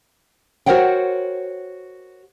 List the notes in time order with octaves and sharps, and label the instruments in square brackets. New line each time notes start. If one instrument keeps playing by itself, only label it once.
[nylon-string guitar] F#4 A#4 C5 C#5 F#5 G5